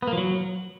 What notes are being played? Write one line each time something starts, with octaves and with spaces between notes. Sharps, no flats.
B3
A#3
F3
F#3